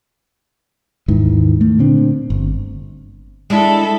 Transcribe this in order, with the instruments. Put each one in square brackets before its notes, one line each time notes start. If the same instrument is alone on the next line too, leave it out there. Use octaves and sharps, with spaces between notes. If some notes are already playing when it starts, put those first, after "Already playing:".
[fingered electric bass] D#2 G#2 D#3 E3
A3
A#2 D3 C4 D4
G1
[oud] G#3 D4 E4 [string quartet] A4 E5